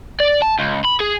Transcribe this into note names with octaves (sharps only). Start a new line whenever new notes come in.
D5
A5
C#2
B5
G#4